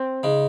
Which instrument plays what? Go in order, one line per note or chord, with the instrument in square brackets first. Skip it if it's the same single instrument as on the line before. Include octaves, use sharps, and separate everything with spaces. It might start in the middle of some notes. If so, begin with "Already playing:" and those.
Already playing: [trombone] C4
[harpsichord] C#3 G#3 D#4